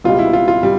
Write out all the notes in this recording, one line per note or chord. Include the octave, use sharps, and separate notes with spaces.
C#2 B2 G3 F4
E4
F4
F4
G3